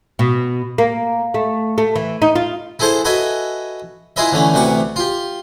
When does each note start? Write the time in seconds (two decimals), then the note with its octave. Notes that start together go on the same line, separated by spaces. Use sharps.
0.19 B2
0.78 A#3
1.34 A3
1.78 A3
1.96 E3
2.22 D#4
2.36 F4
2.79 E4 G#4 A4 C5 F#5 A5
3.05 F#4 A4 B4 D#5 E5 G#5
4.16 E4 F4 G#4 B4 D#5 E5
4.32 D3 E3 A3 C#4
4.54 D2 C3 E3 F#5 C#6 D6
4.96 F4 G4